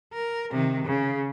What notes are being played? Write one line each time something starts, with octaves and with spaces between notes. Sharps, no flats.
A#4
C3 D#3
C#3